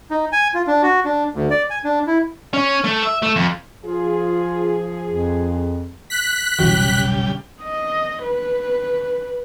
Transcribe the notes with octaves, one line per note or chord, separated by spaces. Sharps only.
D#4
G#5
F4
D4
F#4
D4
D2
D5
G#5
D4
E4
C#4
A3
E5
A3
F2
F3 F4 G#4
F2
F#6 B6
F1 B1 C#3 E3 G3 F#4 G5
D#5
B4